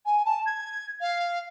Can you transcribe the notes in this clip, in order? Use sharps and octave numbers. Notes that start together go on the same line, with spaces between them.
G#5
A5
G#6
F5